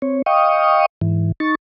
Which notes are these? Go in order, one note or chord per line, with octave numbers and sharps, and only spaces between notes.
C4 C#5
D#5 F5 G5 C#6 D#6
G#2 E3
D#4 C#6 A6